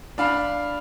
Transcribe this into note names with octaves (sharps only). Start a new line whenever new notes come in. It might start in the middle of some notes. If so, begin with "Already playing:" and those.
D4 F5 B5